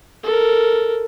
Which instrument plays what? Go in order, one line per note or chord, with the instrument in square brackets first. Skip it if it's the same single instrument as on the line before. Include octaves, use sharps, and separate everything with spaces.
[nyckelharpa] A4 A#4